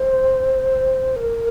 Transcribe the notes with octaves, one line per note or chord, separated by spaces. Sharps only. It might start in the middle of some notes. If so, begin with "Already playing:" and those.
Already playing: C5
A#4